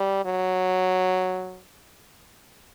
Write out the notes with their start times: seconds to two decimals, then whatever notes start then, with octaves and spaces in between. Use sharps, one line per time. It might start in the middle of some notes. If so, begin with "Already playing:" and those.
Already playing: G3
0.25 F#3